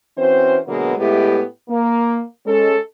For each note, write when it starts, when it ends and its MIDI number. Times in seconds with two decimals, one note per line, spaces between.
0.18 0.57 52
0.18 0.57 60
0.18 0.57 61
0.18 0.57 66
0.18 0.57 72
0.67 0.93 47
0.67 0.93 50
0.67 0.93 54
0.67 0.93 56
0.67 0.93 58
0.67 0.93 59
0.97 1.42 45
0.97 1.42 56
0.97 1.42 59
0.97 1.42 64
0.97 1.42 67
1.69 2.22 58
2.46 2.76 56
2.46 2.76 61
2.46 2.76 69